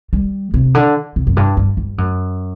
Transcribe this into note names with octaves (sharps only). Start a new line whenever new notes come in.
G3
C3
D3
C3
F#2
G2
G2
G2
F#2